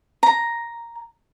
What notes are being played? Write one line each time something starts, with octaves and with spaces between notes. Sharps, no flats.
A#5